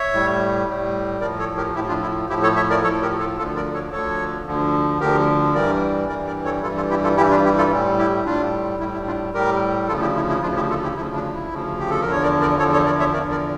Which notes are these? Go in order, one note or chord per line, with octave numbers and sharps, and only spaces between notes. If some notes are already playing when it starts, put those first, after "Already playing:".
Already playing: C#5 E5
A2 G3
A2 G3
A2 F3 A#4 D5
A4 C#5
G4 A#4
A2 F3 E4 G4
D4 F4
E4
A2 F3 E4 G4
A4 C#5
C#5 E5
A#4 D5
A2 F3 A4 C#5
G4 A#4
F4 A4
D2 D3 F3 F4 A4
A#4 D5
A4 C#5
D2 D3 F3 A4 C#5
D2 D3 F3
D2 D3 F3 G4 A#4
G2 E3 G3 A#4 D5
G2 E3 G3 A#4 D5
A#4 D5
A4 C#5
G2 E3 G3 F4 A4
F4 A4
E4 G4
F4 A4
G2 E3 G3 E4 G4
D4 F4
E4 G4
F4 A4
A2 G3
E4 G4
A2 G3 D4 F4
A2 G3 E4
E4
D4 F4
A2 G3 G4 A#4
D2 C#3 F3 F4 A4
E4 G4
E4
E4
D2 C#3 F3 D4 F4
E4 G4
F4 A4
E4 G4
D2 C#3 F3 E4
D4
E4
D2 C#3 F3
G4
A4
E2 D3 F3 A#4
C#5
A#4 D5
A#4 D5
E2 D3 F3 A4 C#5
A4 C#5
A#4 D5
C#5 E5
E2 D3 F3 A#4 D5
A#4 D5